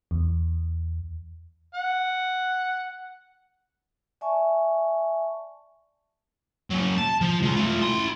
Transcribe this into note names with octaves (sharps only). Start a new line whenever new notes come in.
E2
F#5
D5 E5 G#5 A5 C#6
F#3 A#3
A5
F3
G#3 F4
A3 F4
E4 C6